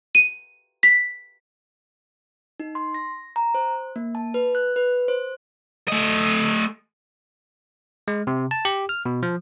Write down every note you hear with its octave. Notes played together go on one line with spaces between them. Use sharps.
D#7
B6
D#4
C6
A#6
A#5
C5
A#3
A5
B4
F#6
B4
C5
A3 D#5
G#3
C3
A5
G4
F6
B2
F3